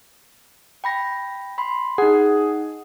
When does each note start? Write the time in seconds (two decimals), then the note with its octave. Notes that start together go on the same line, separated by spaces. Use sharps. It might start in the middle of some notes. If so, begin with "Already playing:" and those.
0.84 G5 B5 A#6
1.58 B5 C6
1.98 D#4 G#4 F#5